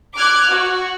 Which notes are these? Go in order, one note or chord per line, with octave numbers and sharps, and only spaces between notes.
D6 F6 F#6 G#6
F#4